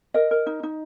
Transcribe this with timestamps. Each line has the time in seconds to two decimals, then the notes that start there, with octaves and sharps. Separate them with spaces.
0.14 A#4 D#5
0.31 A#4
0.46 D#4
0.63 D#4